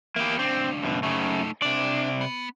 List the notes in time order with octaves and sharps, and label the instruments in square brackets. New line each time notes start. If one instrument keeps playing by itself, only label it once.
[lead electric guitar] E3 B3 [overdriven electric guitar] A#3 G4
[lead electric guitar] C#2 D4 [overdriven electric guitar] C4
[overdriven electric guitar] F#2 B2
[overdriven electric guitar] F#2 C#3 [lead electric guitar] A3 D#4
[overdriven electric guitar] C3 D5 [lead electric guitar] D4
[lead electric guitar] B3